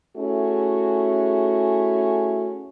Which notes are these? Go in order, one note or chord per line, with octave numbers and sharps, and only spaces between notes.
A3 C#4 E4 F#4 G#4